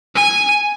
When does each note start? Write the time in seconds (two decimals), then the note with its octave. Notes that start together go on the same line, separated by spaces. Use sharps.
0.15 G#5